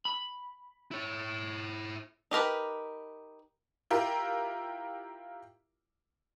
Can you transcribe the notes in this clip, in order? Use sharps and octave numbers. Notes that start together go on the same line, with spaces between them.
B5
E4 C#5
D#4 G4 A#4 B4
E4 F4 G4 A#4